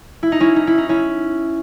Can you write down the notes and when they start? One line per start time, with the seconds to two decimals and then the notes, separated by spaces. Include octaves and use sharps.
0.23 E4
0.32 D#4
0.40 C#4 E4
0.56 D#4
0.67 E4
0.78 D#4
0.89 C#4 E4